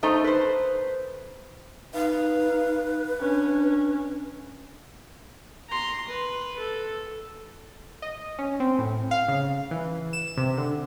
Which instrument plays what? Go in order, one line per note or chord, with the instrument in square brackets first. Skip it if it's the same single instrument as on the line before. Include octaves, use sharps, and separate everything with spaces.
[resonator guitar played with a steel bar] A3 D#4 C5 A#5
B4 C5
[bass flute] D#4 [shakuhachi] B4 [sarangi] F5
[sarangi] C#4 [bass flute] D4
[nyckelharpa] A#5 C6
B4
A4
[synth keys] D#5
C#4
C4
A2
F5
C#3
E3
E7
C3
D3